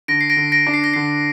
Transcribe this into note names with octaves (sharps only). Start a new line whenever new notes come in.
D3 A#6 D7
C7
A#6 D7
D3
A#6 D7
D4
C7
A#6
D3 C7